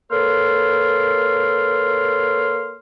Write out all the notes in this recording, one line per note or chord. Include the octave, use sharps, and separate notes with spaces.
A#3 A4 B4 C#5 C6 F6